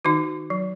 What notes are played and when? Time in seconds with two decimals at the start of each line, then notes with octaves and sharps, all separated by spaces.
0.05 D#3 D#4 F#4
0.50 F#3